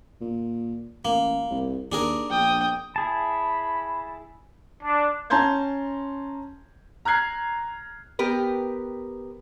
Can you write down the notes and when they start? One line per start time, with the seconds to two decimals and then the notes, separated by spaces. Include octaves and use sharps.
0.21 A#2
1.05 A1 A#3
1.50 C2
1.92 D#2 D4 G#4 A#4
2.30 A#1 G5 D#6
2.96 E4 G#4 A5 B5
4.83 D4
5.30 C#4 A5 A#5 C6 G6 G#6
7.05 A#5 F6 F#6 G#6 C7
8.19 B3 G4 A#4 B4